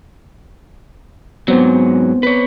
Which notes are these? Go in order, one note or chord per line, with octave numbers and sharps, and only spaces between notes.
G#2 F#3 B3 C4 C5
B4 C#5